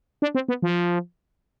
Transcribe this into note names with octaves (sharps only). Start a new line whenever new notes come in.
D4
C4
B3
F3